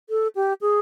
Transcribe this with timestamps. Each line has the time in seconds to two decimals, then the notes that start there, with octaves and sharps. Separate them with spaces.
0.10 A4
0.35 G4
0.61 G#4